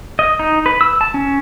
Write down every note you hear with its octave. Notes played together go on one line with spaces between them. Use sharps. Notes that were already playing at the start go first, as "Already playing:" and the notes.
D#5
D#4
B4
E6
A5
C#4